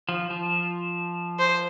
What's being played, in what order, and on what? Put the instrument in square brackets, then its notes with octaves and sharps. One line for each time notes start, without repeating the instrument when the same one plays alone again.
[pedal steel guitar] F3
F3
[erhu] C5